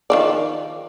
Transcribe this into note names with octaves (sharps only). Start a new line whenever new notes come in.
D#3 F3 D5